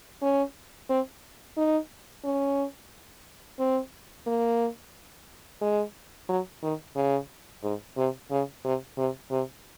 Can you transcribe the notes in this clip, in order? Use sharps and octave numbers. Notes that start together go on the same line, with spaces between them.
C#4
C4
D#4
C#4
C4
A#3
G#3
F#3
D#3
C#3
G#2
C3
C#3
C3
C3
C3